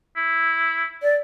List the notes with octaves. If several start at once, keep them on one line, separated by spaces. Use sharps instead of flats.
E4
D5